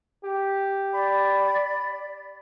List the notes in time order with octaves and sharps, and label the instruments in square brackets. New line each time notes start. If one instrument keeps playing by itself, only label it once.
[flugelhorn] G4
[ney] D5 [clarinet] B5